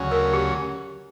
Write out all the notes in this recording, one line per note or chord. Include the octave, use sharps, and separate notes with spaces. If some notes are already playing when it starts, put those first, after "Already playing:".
Already playing: D2 C#3 F#3 C#4 F#4
A#4
G4